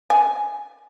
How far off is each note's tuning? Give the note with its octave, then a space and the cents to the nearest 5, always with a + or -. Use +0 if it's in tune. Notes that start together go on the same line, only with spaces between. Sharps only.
G#5 +5